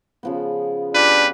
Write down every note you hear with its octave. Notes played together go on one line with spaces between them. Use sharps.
C#3 F3 B3
D4 F4 G4 B4